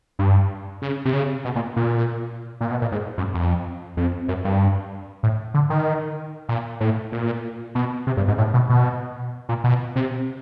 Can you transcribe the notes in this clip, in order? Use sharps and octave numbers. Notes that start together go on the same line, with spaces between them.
G2
C#3
C3
C#3
B2
A#2
A#2
A#2
B2
A#2
G#2
F#2
F2
F2
F#2
G2
A2
D3
D#3
A#2
A2
A#2
B2
C3
G2
G#2
A2
B2
B2
A#2
B2
C3